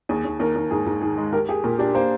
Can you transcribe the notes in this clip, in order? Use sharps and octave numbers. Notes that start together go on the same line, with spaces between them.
D#2 G#4
D#2
D#2 A#4
D#2
G#2 G#4
G#2
D#3 G#4
G#3
G4 A#4
G4 G#4
A#2 A#4
D4 G4
A#3 C5